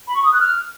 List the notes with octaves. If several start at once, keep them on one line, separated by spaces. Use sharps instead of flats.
B5
C#6
D#6
F#6
F6